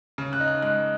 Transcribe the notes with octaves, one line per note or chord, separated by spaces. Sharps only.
C#3
F#6
D#4
F#6
G#3 F#6